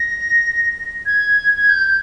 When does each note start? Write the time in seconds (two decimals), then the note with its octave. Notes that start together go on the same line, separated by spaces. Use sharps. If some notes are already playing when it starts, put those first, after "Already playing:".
Already playing: A#6
1.06 G#6
1.57 G#6
1.70 G6